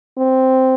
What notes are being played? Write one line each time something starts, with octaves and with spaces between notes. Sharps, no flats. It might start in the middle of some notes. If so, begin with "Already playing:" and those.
C4